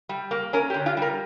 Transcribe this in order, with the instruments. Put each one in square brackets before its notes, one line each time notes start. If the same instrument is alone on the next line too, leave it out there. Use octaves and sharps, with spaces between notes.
[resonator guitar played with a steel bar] G3
A#3
C#4 A#4
G4
D3
F4
G3
A#4